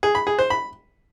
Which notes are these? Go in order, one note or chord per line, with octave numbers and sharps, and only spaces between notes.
G#4
B5
G#4
C5
B5